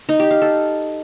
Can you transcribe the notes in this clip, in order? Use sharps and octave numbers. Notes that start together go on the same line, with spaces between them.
D#4
G4
F5
A4